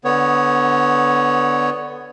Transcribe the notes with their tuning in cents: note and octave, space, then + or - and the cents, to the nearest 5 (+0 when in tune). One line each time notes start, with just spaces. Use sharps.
D3 +0 B3 +10 C#5 +0